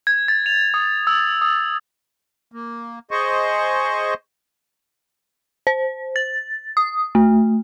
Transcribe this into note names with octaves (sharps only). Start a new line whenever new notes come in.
G#6
A6
F7
D#6
E6
D#6
A#3
G#4 C5 D#5 C#6
C5
A6
D#6
A3